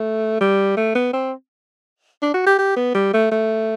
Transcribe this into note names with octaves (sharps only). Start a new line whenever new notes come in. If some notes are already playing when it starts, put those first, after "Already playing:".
Already playing: A3
G3
A3
B3
C4
D4
F#4
G4
G4
B3
G3
A3
A3